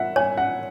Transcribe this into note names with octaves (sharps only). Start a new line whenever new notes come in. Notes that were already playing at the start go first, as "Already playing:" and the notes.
Already playing: E5 F#5
C#5 G#5
F#5